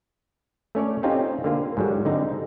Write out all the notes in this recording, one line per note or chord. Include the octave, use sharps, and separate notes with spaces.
A3 C#4 C#5 D5
C4 C#4 D#4 F4 G4
D3 A#3 F4
G#2 F#3 G3
D3 C4 D#4